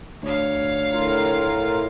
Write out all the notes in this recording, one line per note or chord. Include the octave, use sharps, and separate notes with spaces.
D2 C#5 F5
A2 F4 A#4